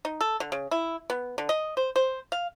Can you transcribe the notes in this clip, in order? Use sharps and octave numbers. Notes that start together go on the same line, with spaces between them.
D#4
A4
D3
C#3
E4
B3
D3
D#5
C5
C5
F5